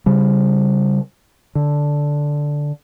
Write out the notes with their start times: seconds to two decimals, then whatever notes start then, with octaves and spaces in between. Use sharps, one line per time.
0.06 C#3 G3
1.55 D3